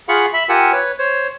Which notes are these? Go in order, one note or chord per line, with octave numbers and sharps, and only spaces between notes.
F4 G#4 F5 F#5 B5 C#6
E5 B5
F4 G4 A#4 F#5 G#5 E6
B4 C#5
C5 C#5